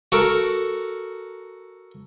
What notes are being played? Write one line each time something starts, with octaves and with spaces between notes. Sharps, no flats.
F#4 A4 A#4